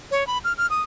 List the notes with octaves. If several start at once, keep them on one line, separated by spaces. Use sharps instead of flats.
C#5
B5
F6
F6
D#6